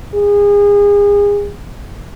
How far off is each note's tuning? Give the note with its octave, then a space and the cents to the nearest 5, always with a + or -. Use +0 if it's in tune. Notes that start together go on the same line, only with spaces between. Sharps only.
G#4 -30